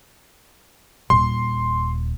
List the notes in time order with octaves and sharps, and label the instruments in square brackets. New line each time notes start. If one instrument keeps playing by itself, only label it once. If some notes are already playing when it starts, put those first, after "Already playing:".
[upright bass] D#1 [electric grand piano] C6